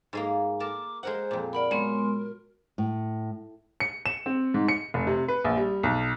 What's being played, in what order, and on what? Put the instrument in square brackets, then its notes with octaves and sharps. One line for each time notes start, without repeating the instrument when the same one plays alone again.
[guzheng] G#2 G#3 A#3
[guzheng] A#4 A5 [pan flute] D6
[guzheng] G#3 A#4 F#5 [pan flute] C5
[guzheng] F2 A#2
[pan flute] A#4 [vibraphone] D5 F#5 B5
[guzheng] F#3 [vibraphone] G#3 B3 C6
[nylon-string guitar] A2
[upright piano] C#7
E7
C4
G#2
C#7
F1
C3
B4
A#1
G3
B1